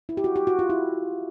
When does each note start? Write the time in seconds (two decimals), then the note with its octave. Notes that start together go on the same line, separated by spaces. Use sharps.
0.09 E4
0.17 G4
0.24 F#4
0.36 G4
0.47 F#4
0.59 F4
0.70 E4